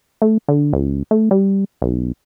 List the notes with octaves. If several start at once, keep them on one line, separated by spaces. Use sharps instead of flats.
A3
D3
C#2
A3
G3
B1